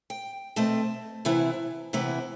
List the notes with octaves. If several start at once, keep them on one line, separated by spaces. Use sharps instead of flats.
G5
B2 A3 C4 A5
C3 E3 B3 E4
C3 E3 B3 E4